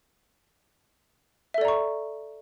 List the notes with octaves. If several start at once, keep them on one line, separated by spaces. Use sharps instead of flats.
A4 D5 E5 A#5 C#6